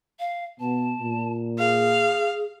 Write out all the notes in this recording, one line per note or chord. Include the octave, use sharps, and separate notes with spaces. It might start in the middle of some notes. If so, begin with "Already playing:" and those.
F5
B2 B3 A5
A#2
G#4 F5